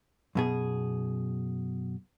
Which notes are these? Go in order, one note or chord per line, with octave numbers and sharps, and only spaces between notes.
F#2 B2 G#4